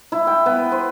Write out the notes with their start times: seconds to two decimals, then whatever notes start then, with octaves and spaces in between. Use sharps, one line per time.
0.12 E4
0.27 G5
0.46 B3
0.72 C5